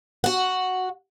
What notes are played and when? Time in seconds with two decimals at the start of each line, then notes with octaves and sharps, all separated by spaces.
0.24 F#4 F#5